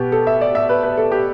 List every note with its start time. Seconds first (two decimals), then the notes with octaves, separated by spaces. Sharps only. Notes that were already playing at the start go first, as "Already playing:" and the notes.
Already playing: B2 B3 G4
0.12 A4
0.27 E5
0.41 D5
0.55 E5
0.69 B4
0.83 B4
0.97 A4
1.12 G4